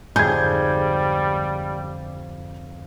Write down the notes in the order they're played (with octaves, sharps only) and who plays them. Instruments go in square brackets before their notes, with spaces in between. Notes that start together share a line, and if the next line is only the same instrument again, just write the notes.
[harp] F2 G#2 D3 [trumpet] G3 [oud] G#4 [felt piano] G6 G#6